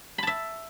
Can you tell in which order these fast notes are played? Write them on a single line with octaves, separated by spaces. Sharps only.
B5 A5 E5